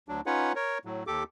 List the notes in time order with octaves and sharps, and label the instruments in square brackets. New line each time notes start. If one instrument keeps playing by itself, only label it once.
[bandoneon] D2 F#3 D4
C#4 D#4 F4 B4 C#5 F#5
A#4 C#5
A2 F#3
D#2 G4 A4 D6